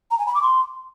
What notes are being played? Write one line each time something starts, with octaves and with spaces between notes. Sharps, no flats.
A#5
G#5
B5
D6
C6